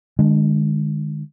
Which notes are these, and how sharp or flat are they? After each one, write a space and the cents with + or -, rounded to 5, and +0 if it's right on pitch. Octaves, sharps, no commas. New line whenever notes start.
D#3 -45 G#3 +0 D4 +0